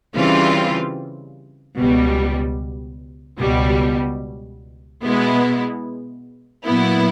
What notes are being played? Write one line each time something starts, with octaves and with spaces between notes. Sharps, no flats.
C#3 E3 G3 C4 F4
C#2 B2 G3
C#2 B2 G3
B2 G#3 B3 E4
A#2 F#3 B3 E4